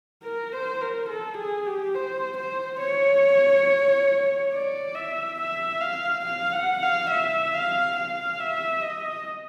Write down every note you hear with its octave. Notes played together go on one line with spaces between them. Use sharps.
A#4
C5
A#4
A4
G#4
G4
C5
C5
C#5
D5
E5
E5
F5
F5
F#5
F5
E5
F5
F5
E5
D#5